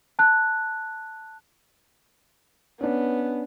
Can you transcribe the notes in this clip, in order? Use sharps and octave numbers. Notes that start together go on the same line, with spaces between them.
A5 F#6
B3 C#4 D4